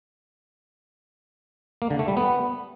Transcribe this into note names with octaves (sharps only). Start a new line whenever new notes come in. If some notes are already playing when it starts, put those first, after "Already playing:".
A#3
D3
A3
G3
B3